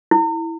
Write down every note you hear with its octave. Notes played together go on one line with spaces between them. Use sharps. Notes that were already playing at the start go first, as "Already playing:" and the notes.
E4